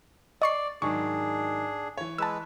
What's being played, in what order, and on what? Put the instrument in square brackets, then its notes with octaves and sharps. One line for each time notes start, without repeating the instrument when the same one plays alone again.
[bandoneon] D5 [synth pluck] D#5 C#6 C7
[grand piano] G#2 D#3 F#3 [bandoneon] D4 G#4 [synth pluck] C#6
[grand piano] E3 C#5
[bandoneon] G#3 B4 [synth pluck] A5 E6